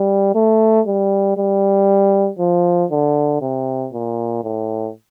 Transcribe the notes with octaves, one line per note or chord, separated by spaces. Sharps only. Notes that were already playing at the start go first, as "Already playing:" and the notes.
Already playing: G3
A3
G3
G3
F3
D3
C3
A#2
A2